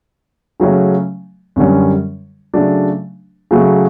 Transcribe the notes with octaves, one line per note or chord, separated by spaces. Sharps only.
C#3 F#3 A3 C#4
F#2 D3 G3 C#4
C#3 F#3 A3 D4
C#3 F#3 A3